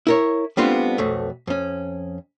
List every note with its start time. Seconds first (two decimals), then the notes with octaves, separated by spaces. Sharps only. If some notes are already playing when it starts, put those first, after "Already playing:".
0.07 E4 A#4 C#5
0.57 G3 A3 B3 C4 D4 F4
0.98 B1 F2 A3
1.47 F2 C#4